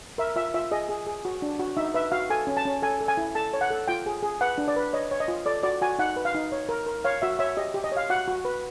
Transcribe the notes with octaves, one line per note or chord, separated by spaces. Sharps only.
A#4 E5
F4 E5
F4 E5
G#4 D#5
G#4
G#4
F#4
D4
F#4
D#4 E5
B4 E5
F#4 F5
A4 G#5
C#4
A5
C#4
A4 G#5
A4
G#5
E4
A4 A5
C#5
F#5
A4
F4 G5
G#4
G#4
B4 F#5
D4
D5
B4
C#5 D#5
C#5
D#5
F4
A4 D5
F#4 D5
F#4 G#5
D#4 F#5
B4
F5
D#4
C#5
A#4
A#4
C#5 F5
F#4 E5
C#5 E5
G4 D#5
G4
D#5
C#5 F5
F#4 F#5
F#4
B4